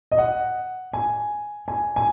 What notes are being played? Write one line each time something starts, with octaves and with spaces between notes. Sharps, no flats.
D#5
F#5
G#5
G#5
G#5